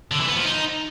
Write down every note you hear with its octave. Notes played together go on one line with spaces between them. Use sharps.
D3
E3
B3
F3
D#4